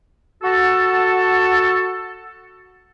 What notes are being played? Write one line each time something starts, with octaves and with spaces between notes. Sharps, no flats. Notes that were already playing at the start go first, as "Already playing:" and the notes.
F#4 A4